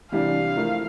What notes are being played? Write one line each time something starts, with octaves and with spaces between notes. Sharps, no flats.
C3 E3 G3 D4 F5
F3 A3 E4 A#4